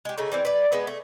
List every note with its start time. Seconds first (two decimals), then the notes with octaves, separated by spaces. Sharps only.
0.05 G#3 G4
0.18 C#3 A3 D#4
0.32 E3 G3 C4
0.45 B4 D5
0.72 G#3 B3 B4
0.87 A3